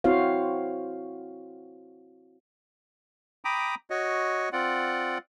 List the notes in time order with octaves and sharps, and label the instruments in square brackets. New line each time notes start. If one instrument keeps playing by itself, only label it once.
[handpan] C4 E4 F#4 C5 C#5 F5
[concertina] G5 A#5 B5 D6 D#6
F#4 C#5 D#5
C4 F4 D5 F#5